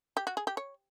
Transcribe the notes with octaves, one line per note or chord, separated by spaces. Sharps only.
G4
F#4
G#4
G4
C#5